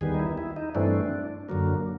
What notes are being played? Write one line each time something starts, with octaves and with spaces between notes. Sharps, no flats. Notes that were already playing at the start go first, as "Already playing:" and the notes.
D#2 D#3 G3 B3 G#4
D#4
E4
E4
D#4
G2 E3 A3 C4 D4
F#2 D3 F#3 A#3